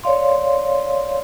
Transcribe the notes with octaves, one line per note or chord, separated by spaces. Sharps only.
C#5 D5 F5 C6